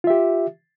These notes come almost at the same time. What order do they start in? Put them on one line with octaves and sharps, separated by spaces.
F4 E5 G4